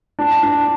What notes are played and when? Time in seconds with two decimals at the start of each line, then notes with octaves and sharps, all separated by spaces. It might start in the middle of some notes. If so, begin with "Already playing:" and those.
0.19 D4
0.43 D4